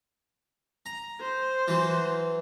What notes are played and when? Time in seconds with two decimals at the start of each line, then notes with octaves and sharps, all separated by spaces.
0.86 A#5
1.21 C5
1.68 E3 F#3